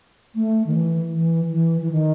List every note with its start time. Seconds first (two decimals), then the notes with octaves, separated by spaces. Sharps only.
0.35 A3
0.66 D#3
0.74 E3
1.13 E3
1.52 E3
1.81 E3
1.91 D#3